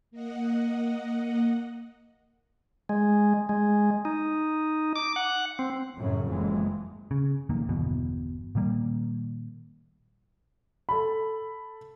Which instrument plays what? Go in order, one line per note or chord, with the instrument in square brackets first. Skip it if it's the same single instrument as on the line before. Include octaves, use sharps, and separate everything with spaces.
[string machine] A#3 D#5 F#5
[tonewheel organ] G#3
G#3
D#4
D6
F#5
C4
[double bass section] F#2 A2 C#3 F#3
F#1 F2 E3 G#3
[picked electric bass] C#3
B1 F2 D#3 A#3
G1 E2 B2
A#2 D#3 G3 A#3
[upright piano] A4 B5